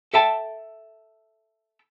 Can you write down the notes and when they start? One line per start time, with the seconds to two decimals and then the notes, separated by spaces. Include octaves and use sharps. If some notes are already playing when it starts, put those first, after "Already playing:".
0.14 A4 E5 G5 A5